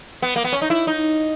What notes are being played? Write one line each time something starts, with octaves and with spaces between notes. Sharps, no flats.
B3
A#3
B3
C#4
D#4
E4
D#4